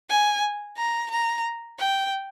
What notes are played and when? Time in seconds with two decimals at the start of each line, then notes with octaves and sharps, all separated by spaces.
0.09 G#5
0.77 A#5
1.10 A#5
1.79 G5